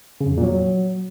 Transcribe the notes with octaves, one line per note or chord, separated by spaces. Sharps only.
C#3
F#2
F2
A#2
F#3